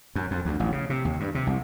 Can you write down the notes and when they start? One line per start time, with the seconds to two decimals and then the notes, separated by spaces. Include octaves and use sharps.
0.15 F#2
0.31 F2
0.45 D2
0.60 A1
0.72 C#3
0.90 C3
1.05 D#2
1.20 G2
1.35 C3
1.47 C2